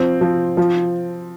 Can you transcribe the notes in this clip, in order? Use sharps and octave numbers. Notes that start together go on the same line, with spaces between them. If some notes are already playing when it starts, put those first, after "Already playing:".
Already playing: F3 C4
F3
F3